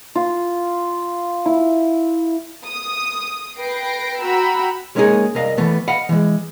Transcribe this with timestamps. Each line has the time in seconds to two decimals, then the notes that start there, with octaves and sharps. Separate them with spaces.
0.15 F4
1.46 E4
2.64 D#6
3.57 B4 G5 A#6 C7 D7
4.22 F#4 G5 A#5 B5 E6
4.95 G3 G#3 A#3 C#4 D#4 G#4
5.35 C2 A#4 D#5 F5
5.57 E3 A3 B3
5.88 D#5 F5 F#5 B5
6.09 E3 G#3